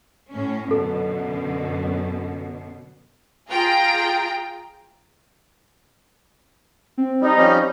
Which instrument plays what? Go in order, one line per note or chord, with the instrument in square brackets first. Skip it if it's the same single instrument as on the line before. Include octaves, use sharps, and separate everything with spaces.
[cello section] A2 C#4
[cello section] F#2 B2 D3 [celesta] A4
[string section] F4 G#4 G5 A#5
[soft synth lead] C4
[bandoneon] G3 [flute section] D#4
[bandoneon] F3 G3 C#4 [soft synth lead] C4